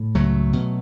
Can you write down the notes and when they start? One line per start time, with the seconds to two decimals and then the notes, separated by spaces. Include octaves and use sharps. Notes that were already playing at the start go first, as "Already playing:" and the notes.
Already playing: A2
0.15 C#2 F#3 A3
0.53 B2